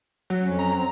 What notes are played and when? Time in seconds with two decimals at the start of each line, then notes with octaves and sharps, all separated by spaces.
0.30 F#3
0.43 F2 C#4
0.59 A#5
0.75 C4